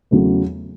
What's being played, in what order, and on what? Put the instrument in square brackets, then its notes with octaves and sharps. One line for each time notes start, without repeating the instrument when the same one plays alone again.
[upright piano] E2 C#3 F#3 A3